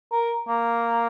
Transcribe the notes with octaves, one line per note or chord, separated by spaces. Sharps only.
A#4
A#3